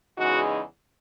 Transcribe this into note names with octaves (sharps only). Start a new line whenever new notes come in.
E2 C#3 E3 G#3 D#4 F#4